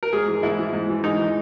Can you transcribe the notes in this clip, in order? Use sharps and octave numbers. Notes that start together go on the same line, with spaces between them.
A#4
G#2 G#4
E3
G#2 E4
E3
G#2
E3
G#2 D#4
E3